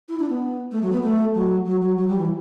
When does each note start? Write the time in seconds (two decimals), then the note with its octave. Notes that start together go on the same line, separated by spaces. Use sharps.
0.09 E4
0.19 D4
0.30 B3
0.72 A3
0.82 F#3
0.92 B3
1.03 A3
1.34 F#3
1.65 F#3
1.81 F#3
1.97 F#3
2.08 G3
2.18 E3